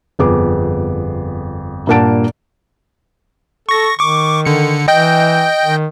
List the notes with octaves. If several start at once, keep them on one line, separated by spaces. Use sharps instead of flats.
G1 F2 B3 G#4 D6
G2 A#2 A#3 F#5 A5 D7
A4 C#6 A#6
D#3 C#6 D6
D3 C#7
E3 D#5 G5 G6
D#3